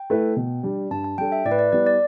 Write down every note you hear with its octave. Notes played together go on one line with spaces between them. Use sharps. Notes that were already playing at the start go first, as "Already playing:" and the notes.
Already playing: G5
A3 E4 B4
B2
G3 D4
G2 A5
A5
G3 D4 A4 G5
E5
A2 D5
B4
D5
G3 B3 E4 D5
D5